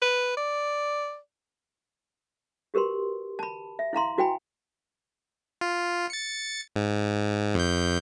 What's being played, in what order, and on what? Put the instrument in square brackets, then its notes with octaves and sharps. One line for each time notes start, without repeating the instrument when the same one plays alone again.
[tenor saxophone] B4
D5
[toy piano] F#4 G4 A#4 B4 C6
A5 B5
E5
E4 F5 A#5 C6
E4 F#4 B4 G5 G#5 B5
[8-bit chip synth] F4
A6 C#7
G#2
F2 G6